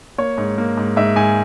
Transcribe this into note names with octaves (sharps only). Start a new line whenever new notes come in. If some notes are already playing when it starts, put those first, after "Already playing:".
A#3 C#5
G#2
A#3
G#2
G#2 E5
G#2 G#5